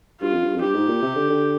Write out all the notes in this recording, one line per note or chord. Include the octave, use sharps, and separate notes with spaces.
G2 F4
F2
G2
F2
G2 G4
G#2
A#2
C3
D3
D3